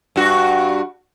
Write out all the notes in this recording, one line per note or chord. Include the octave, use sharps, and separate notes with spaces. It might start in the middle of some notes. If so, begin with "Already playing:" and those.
G2 F#4